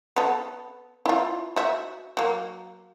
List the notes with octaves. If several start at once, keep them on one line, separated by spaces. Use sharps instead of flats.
B3 A4
E4 F4
F#4 E5
F#3 A#3